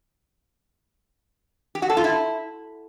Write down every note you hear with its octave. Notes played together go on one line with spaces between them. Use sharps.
G4
F#4
A4
F4
E4